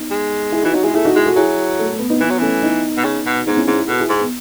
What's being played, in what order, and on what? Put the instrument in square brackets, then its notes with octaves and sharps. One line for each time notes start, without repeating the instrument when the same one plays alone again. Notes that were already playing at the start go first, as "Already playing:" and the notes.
Already playing: [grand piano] B3 D#4
[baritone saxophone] G#3
[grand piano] E4 G#4
[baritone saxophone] E3 [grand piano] D#4 F#4
[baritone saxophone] F#3 [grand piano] D#4 F#4
[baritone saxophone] G#3 [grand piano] E4 G#4
[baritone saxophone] A3 [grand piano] E4 G#4
[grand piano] D#4 F#4
[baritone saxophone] G#3 [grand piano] E4 G#4
[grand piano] F#4 A4
[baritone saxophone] F#3 [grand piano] E4 G#4
[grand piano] A3
A3
B3
B3 D#4
[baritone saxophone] E3 [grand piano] B3
[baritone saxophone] F#3
[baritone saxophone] E3 [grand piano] A3 C#4
[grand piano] B3 D#4
[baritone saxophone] B2
C#3
B2
[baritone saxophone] G#2 [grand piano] B3 D#4
[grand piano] C#4 E4
[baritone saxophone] G#2 [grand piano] C#4 E4
[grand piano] E4 G#4
[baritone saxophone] B2 [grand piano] F#4 A4
[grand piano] E4 G#4
[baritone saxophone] G#2
[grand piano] B3